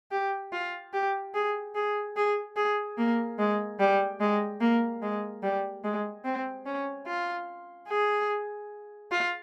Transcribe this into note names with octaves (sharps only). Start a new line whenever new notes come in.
G4
F4
G4
G#4
G#4
G#4
G#4
A#3
G#3
G3
G#3
A#3
G#3
G3
G#3
C4
C#4
F4
G#4
F4